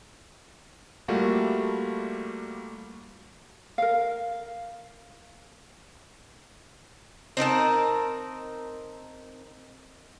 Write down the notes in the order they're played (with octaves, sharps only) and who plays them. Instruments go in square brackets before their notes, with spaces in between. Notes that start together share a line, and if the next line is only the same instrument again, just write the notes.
[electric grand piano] G3 A3 A#3 F4 F#4
[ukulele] A#4 F5
[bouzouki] C4 D#4 A#4 A5